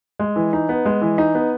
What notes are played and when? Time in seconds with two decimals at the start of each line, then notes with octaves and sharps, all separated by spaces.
0.19 G#3
0.36 E3
0.53 D#4
0.69 B3
0.85 G#3
1.02 E3
1.18 D#4
1.35 B3